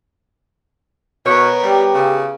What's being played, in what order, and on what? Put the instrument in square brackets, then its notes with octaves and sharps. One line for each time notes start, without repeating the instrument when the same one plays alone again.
[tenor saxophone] B2 [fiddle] B3 A#4 [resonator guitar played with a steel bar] C#5
[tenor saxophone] G3 [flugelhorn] G4
[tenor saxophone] C#3